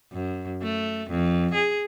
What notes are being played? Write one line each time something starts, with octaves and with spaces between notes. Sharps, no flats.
F#2
A3
F2
G#4